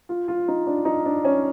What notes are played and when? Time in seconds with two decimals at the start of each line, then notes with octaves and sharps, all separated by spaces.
0.09 F4
0.28 F4
0.48 D#4
0.67 D4
0.85 D#4
1.05 D4
1.25 C#4